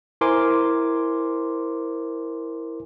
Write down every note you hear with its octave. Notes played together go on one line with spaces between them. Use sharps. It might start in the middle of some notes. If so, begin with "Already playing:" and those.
E4 A#4 C5 G#5 C6 D6